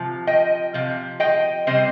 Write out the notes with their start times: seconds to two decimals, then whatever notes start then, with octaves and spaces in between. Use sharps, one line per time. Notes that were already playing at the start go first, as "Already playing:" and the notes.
Already playing: C3 F3
0.27 D#5 G5
0.74 C3 F3
1.20 D#5 G5
1.67 C3 G3 C4 C5 D#5